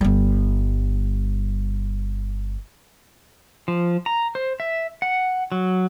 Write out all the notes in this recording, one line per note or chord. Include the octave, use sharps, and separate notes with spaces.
G1 G3
F3
A#5
C5
E5
F#5
F#3